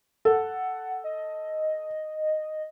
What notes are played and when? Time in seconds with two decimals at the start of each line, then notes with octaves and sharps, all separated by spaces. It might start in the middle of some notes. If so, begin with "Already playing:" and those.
0.25 A4 F#5
1.04 D#5